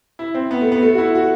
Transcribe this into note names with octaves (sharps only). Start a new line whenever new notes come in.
E4
C4
B3
A3
B3
A3
F#4
E4
F#4